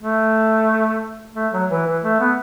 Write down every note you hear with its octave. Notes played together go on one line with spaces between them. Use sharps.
A3
A3
F#3
E3
E3
A3
B3